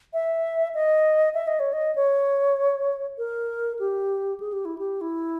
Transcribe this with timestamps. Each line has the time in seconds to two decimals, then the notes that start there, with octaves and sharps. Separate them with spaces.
0.13 E5
0.74 D#5
1.34 E5
1.47 D#5
1.59 C#5
1.73 D#5
1.96 C#5
3.18 A#4
3.79 G4
4.40 G#4
4.53 G4
4.65 E4
4.78 G4
5.01 E4